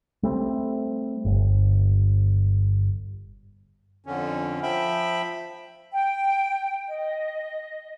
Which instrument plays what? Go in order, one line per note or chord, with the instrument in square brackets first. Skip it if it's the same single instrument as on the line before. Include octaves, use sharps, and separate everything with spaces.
[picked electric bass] G3 A3 C4
G1
[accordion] F2 D3 C#4
F3 E5 G5 B5
[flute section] G5
D#5